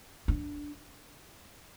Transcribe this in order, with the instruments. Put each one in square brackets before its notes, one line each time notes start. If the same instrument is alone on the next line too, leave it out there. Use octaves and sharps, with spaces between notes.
[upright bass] D4